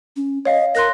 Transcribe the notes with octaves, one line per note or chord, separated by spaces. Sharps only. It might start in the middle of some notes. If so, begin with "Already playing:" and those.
C#4
C#5 D#5 F5
A#4 C6 F#6 A#6